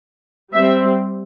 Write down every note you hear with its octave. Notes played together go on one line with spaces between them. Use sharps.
G3 C4 E5